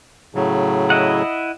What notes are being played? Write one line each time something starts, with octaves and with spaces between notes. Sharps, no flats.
A2 C#3 F#3
E4 D#5 F#5